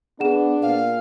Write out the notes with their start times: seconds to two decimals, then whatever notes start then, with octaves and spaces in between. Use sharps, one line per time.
0.20 B3 D4 G#4 F#5 E7
0.62 A#2 F5